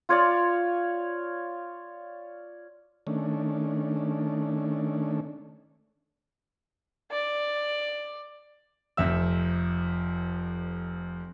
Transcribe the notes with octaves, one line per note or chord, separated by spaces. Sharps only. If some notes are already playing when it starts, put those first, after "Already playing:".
F4 C#5 D5 F5
D#3 A3 C#4 D4
D5
F1 F2 E5 E6